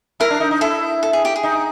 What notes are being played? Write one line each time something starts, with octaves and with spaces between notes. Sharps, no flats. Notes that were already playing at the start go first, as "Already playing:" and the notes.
E4 A#4
D4
D#4
D#4
E4 A4
A4
G#4
G4
G#4
D#4